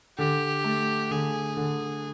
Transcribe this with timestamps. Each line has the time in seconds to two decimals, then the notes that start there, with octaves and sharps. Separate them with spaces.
0.18 D3 G4
0.64 A3
1.11 D3 G#4
1.57 D3